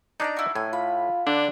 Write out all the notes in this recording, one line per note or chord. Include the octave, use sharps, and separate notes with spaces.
D4 D#4 D5 G#5 A#5
E4 F#4
A2 G#5
F4 B5
D3 D4